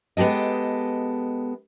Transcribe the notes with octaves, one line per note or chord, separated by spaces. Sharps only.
G#3 B3 G4 A4 D#5